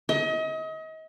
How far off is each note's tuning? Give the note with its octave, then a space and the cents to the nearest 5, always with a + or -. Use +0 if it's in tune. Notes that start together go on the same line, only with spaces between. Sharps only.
D#5 +35